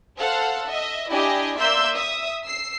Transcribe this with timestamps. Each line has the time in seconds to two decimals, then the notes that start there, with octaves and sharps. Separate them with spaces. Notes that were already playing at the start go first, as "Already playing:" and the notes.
0.18 A4 C5 F5 F#5
0.68 D#5 E5
1.10 D4 E4 G4 D#5 G#5
1.59 A#3 D5 E5 C6 E6 G6
1.95 E5 D#6
2.44 E6 C7